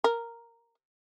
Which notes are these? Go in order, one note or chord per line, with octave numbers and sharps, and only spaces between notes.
A#4